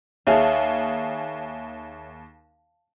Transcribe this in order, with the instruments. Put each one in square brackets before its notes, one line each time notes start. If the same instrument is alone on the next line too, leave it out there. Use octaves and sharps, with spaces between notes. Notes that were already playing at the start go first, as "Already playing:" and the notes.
[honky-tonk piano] D#2 G#4 [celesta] C#5 E5 [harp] F5 A5